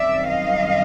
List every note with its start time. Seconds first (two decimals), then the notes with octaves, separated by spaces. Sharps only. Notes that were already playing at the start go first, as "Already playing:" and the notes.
Already playing: F#2 D#3 G3 C4 D5 E5
0.28 D#5 F5